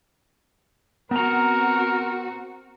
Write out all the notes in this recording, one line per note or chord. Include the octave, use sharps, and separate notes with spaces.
B3 C4 F#4 A#4 A#5